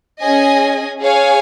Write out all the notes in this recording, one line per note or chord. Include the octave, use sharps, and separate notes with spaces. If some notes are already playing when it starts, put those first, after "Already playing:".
C#4 G#4 D#5 G#5
G#4 C#5 F5 G#5